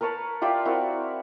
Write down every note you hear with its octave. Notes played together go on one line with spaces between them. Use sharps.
A#4 B4 C#5 A5
F4 G4 D5 E5
C4 E4 F#4 A#4